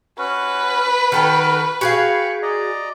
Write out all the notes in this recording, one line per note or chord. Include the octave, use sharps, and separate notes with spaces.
C#4 F#4 B4
D#3 F#4 A4 G5 F6
F#4 G#4 F5 G5 B5 C#6
D5 D#5 A#5